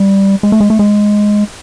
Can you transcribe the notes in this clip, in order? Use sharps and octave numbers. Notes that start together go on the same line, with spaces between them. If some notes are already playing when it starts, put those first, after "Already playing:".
Already playing: G3
G#3
A3
G#3
A3
G#3